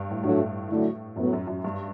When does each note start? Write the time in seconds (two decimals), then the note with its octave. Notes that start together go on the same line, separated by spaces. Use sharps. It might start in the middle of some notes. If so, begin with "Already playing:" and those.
Already playing: G2
0.11 A2
0.23 A2 F#3 A3 D4 F#4
0.70 D3 F#3 A3 E4
1.16 F#2 A2 F#3 B3
1.33 F#2
1.47 F#2
1.64 G2